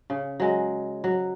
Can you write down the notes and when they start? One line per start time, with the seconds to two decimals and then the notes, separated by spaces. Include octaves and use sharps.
0.10 C#3
0.40 F#3 G#3
1.04 F#3